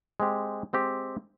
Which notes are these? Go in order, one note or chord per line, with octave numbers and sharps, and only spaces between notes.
G#3 C4 G4
G#3 C4 G4